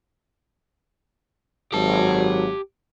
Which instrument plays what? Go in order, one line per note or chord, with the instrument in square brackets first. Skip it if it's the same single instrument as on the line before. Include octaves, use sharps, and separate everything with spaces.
[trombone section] G#1 F#3 [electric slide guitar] G4 A5